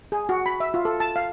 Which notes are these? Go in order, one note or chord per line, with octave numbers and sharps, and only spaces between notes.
G#4
F#4
B5
E5
F4
A4
A5
F5